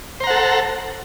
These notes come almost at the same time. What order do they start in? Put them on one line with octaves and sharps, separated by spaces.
C5 A#5 F#5 A4